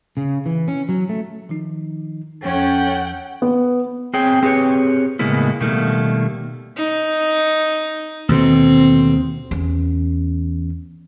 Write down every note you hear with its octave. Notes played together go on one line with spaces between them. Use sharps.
C#3
E3
C#4
F#3
A3
D#3 F3 D#4
E2 F3 C#4 A4 F#5 G5
B3
C4 G#4 C#5 G5
C4 G4 G#4 B4 C#5
A2 C#3 G#3 A#3 B3 E4
B2 D#3 G3 A3 A#3
D#4
D#2 B2 D3 C4
E2 C#4